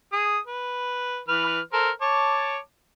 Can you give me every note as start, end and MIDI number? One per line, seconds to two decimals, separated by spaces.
0.12 0.39 68
0.12 0.39 87
0.47 1.20 71
1.28 1.60 52
1.28 1.60 71
1.28 1.60 89
1.73 1.90 69
1.73 1.90 70
1.73 1.90 72
2.01 2.58 73
2.01 2.58 81
2.01 2.58 86